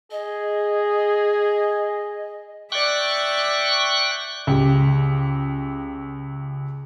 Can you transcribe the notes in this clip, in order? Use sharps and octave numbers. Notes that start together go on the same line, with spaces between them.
G#4 D#5
D5 E5 G5 C#6 F#6
C#2 G4